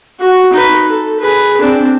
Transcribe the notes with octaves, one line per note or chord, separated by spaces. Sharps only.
F#4
D#4 B4
A4
G#4 B4
C4 D4